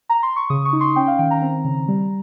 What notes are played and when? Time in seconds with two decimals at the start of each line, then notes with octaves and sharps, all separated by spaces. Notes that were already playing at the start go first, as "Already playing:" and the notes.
0.09 A#5
0.23 C6
0.36 C#6
0.50 C#3 D#6
0.65 C#6
0.73 D#4
0.80 C6
0.96 C#4 G5
1.08 F5
1.19 D#3 G5
1.31 A#5
1.42 C4
1.65 C#3
1.88 G3